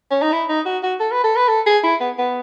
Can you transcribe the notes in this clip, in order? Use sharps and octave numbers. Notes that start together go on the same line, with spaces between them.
C#4
D#4
E4
D#4
F#4
F#4
A4
B4
A4
B4
A4
G#4
E4
B3
B3